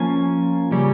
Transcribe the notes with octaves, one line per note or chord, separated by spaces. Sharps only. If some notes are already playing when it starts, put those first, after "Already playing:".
Already playing: F3 A#3 C#4 G#5
C#3 G3 C#4